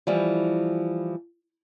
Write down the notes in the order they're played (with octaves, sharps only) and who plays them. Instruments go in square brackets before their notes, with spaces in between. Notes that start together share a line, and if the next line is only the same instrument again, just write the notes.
[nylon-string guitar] E3 F3 G3